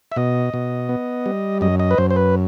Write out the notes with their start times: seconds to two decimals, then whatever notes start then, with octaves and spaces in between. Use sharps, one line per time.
0.12 E5
0.16 B2 D#5
0.54 B2
0.89 B3
1.26 G3
1.61 F#2 D#5
1.80 D#5
1.91 B4
1.98 F#2 C5
2.10 C5
2.16 B4